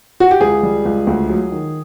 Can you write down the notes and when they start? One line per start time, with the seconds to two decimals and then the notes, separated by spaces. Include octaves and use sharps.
0.20 F#4
0.31 G4
0.41 C#2 G#4
0.63 G3
0.85 C#2
1.07 D2
1.29 F#3
1.51 D#3